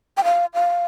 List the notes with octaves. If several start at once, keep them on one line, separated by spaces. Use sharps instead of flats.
G5
F5
F5